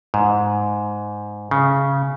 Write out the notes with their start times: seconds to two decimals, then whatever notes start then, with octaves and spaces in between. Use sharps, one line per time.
0.14 G#2
1.51 C#3